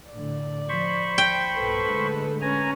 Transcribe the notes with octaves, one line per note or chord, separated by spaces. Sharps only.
A2 D3 D5
F3 C5 B5 C#6
D#2 G5
B1 G2 A#2 A4 B4
A2 D3 G#3
C#4 B4 G#5 A#5